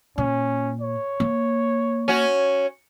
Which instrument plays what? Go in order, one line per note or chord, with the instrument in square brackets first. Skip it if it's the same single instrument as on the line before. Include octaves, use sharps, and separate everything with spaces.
[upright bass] A#2 [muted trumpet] C#4
[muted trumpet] C#5
[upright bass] A#3
[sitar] C#4 F#4